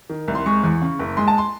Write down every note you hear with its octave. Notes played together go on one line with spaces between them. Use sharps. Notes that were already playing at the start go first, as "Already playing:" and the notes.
D#3
C2
C6
G#3 C#6
E2
C#3
F#1
G#3 C6
A5
C6